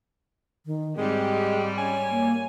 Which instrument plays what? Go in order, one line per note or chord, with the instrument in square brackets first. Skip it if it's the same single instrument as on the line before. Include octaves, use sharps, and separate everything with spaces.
[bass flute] D#3
[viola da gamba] G#2 G3 [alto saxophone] G#3 [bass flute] C4 [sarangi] G4
[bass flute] C#4 [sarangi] C#5 [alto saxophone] G#5
[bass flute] A#3